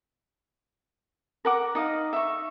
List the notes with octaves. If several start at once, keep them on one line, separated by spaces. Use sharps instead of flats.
A#4 F#5 D6
D#4 D#5 F5
E5 C#6